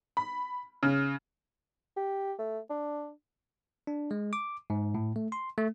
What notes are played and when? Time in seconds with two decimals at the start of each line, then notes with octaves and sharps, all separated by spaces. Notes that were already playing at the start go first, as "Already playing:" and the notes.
0.17 B5
0.83 C#3
1.97 G4
2.38 A3
2.70 D4
3.87 D4
4.11 G#3
4.33 D6
4.70 G#2
4.95 A2
5.16 A3
5.32 C6
5.57 A3